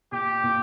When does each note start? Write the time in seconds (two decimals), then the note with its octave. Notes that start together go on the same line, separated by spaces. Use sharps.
0.12 A#2 G4
0.44 A#2